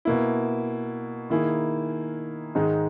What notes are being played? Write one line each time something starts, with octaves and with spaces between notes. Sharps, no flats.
B2 A#3 E4
D#3 A#3 E4 G#4
G#2 D#3 G#3 D#4